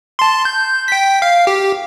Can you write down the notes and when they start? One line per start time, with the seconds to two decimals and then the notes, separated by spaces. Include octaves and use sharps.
0.19 A5 C6
0.45 G6
0.88 G5 B6
1.22 F5
1.47 G4